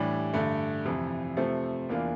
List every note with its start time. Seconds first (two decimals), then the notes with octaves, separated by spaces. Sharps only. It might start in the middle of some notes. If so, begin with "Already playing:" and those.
Already playing: A2 E3 G3 D4 G4
0.34 G2 D3 A3
0.85 F2 C3 E3
1.37 C3 F3 A3 C4
1.89 E2 E3 A#3 D4 F4